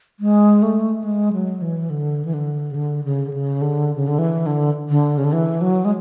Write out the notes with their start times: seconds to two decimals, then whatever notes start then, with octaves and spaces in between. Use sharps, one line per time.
0.20 G#3
0.62 A3
1.04 G#3
1.33 F#3
1.62 E3
1.90 D3
2.25 E3
2.34 D3
2.71 C#3
2.75 D3
3.04 C#3
3.27 D3
3.33 C#3
3.62 D3
3.96 C#3
4.08 D3
4.18 E3
4.46 D3
4.89 D3
5.18 C#3
5.24 D3
5.33 E3
5.61 F#3
5.85 G#3